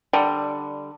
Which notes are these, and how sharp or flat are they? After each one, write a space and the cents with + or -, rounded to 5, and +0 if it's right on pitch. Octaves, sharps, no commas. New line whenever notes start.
D3 +10 G3 +0